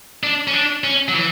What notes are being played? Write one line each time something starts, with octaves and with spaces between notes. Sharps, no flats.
D4
C#4
D4
C#4
F#3
E3